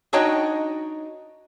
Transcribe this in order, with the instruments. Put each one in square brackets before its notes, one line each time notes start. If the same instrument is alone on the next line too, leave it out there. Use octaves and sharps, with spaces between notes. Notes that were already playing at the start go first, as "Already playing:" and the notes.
[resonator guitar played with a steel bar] D4 D#4 F#4 C#5 D#5 G5